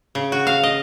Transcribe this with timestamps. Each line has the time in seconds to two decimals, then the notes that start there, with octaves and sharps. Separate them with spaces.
0.15 C#3
0.32 F#4
0.47 F5
0.63 D#5